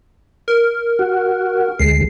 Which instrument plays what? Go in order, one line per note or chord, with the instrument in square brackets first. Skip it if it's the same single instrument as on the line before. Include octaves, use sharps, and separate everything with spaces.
[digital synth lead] A#4
[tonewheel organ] F#4
[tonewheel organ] D2 G#3 [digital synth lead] C7